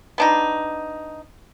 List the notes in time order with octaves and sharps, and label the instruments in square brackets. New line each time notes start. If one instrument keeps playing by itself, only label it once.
[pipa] B3 D4 D#4